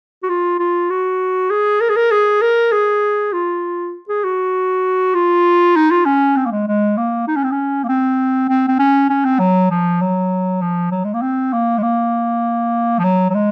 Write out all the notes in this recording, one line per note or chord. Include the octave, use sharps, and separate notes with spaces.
F#4
F4
F4
F#4
G#4
A#4
G#4
A#4
G#4
A#4
G#4
F4
G#4
F#4
F4
D#4
F4
C#4
C4
A#3
G#3
G#3
A#3
D#4
C#4
C4
C#4
A#3
C4
C4
C4
C#4
C#4
C4
F#3
F3
F#3
F3
F#3
G#3
A#3
C4
A#3
G#3
A#3
F3
F#3
F#3
G#3